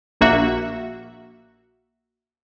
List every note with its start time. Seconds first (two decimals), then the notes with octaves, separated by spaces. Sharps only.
0.21 A#1 A#3 F#4 E5